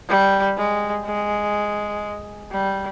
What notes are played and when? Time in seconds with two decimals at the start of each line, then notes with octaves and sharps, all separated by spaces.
0.09 G3
0.57 G#3
1.06 G#3
2.52 G3